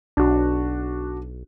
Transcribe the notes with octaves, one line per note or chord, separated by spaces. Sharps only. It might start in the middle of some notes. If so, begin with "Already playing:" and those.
B1 D4 F#4